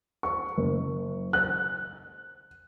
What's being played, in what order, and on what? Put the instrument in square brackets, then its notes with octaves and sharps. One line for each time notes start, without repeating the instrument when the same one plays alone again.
[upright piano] C#6
F#1
F#6